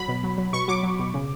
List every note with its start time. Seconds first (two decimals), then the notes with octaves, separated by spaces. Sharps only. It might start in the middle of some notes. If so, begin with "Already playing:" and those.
Already playing: F#3 B5
0.08 B2
0.23 F#3
0.38 F#3
0.53 B2 C#6
0.68 F#3 D6
0.83 F#3
0.99 B2
1.14 C#3